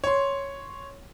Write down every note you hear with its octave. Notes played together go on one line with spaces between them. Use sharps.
C#5 C6